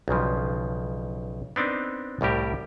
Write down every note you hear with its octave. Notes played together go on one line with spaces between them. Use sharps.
B1 G2 C#3 F3
B3 C4 D4 D#4 A#4
C2 A2 G3 G4 A#4